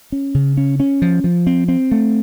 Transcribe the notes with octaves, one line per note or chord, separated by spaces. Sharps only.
C#4
C#3
C#4
C#4
F3
F3
C4
C4
A3